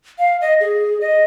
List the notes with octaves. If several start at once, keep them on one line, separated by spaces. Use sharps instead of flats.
F5
D#5
G#4
D#5